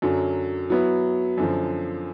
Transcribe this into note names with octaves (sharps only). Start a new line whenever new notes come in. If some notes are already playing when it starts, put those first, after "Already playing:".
F#2 D3 F#3
F#3 B3 E4
F#2 D3 F3